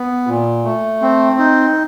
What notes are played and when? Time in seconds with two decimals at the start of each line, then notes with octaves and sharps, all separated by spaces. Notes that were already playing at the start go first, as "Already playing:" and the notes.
Already playing: B3
0.27 A#2
0.64 A3
1.02 C4
1.39 D#4